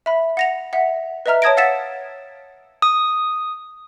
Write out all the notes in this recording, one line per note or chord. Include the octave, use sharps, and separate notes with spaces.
E5 B5
F#5 A#6 F7
E5 F#5
B4 D#5 E5 A#5 F6
C#5 A5 D#6 G#6 A#6 D7
F5 F#5 E6 A6 B6 E7
D#6